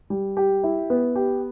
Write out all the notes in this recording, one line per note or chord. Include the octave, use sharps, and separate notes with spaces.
G3
G4
E4
B3
G4